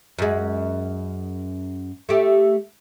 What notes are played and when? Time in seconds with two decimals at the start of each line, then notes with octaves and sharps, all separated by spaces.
0.19 F#2 G#3
2.09 A3 G4